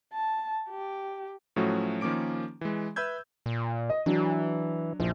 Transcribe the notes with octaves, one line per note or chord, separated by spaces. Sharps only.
A5
G4
A2 F3 F#3 A3 C#4 F#4
D#3 F3 A#3 C#4 D6 D7
E3 G#3
B4 E5 B5 E6 G6 G#6
A#2
D#5
E3 F#3 D4
A#1 F3